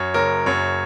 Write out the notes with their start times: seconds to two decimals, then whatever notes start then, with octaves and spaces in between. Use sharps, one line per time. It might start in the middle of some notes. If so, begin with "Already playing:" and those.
Already playing: F#2 C#5
0.14 F#1 A#4
0.46 F#2 C#5